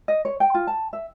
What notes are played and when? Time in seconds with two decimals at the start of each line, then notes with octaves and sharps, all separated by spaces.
0.08 D#5
0.25 C#5
0.40 G5
0.54 F4
0.67 A5
0.93 E5